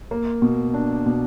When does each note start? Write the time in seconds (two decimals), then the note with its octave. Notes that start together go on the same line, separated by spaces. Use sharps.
0.11 A#3
0.42 B2
0.74 D4
1.06 B2